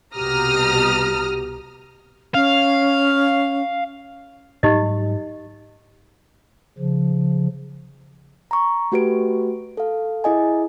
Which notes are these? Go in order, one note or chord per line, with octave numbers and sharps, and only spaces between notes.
C2 B2 G4 A#5 D#6 F6
C#4 F5
G#2 F#3 G3 D#4 G4 D#5
C#3 F3
A#5 C#6
A3 F#4 G4 B4 D7
A4 F5
E4 G#4 D#5 G#5